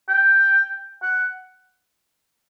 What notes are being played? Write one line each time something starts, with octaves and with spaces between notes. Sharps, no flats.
G5
F#5